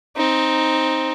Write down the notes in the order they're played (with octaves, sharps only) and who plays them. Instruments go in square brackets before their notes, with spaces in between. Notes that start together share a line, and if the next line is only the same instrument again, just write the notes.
[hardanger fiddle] C4 D#4